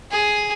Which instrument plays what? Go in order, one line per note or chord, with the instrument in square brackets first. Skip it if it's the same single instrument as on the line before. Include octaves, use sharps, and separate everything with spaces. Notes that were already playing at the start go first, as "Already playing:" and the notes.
[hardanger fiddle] G#4